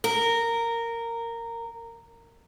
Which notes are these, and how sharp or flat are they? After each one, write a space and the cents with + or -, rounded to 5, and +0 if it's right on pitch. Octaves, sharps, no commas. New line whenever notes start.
A#4 -10